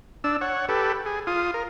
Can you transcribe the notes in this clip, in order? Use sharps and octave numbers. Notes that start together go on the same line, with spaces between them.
D4 E6
C#5 F#5
G4 A4 B4
G#4
F4 D#6
A#4